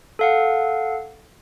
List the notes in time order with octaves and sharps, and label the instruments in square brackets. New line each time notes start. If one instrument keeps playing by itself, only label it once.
[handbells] A4 F5 F#5